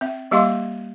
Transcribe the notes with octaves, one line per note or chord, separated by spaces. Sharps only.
C4 E5
G3 A#3 G4 D#5 F5 C6